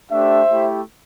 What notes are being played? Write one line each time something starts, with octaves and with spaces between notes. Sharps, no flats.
A3 D4 G4 C5 E5
A3 E4 G4